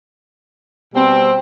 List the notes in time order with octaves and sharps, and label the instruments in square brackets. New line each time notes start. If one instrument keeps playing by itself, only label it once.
[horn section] B2 G3 C4